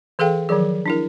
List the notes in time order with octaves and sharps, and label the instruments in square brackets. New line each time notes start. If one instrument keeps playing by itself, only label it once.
[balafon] E3 G#4 A4 F5 G5
D#3 F3 F#3 G#4
D4 E4 A#4